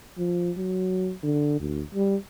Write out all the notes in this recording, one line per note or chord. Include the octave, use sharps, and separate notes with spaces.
F3
F#3
D3
D2
G3